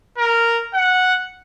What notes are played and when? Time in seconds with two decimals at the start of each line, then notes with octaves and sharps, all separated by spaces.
0.18 A#4
0.74 F#5